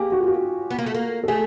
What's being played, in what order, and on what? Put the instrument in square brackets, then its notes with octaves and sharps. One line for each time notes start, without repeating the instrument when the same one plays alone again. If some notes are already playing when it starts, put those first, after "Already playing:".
Already playing: [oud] A#3 [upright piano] G4 G#4
[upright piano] F#4
F4
F#4
[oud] B3
A#3
A3
A#3
[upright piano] A4
[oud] A3 [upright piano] G#4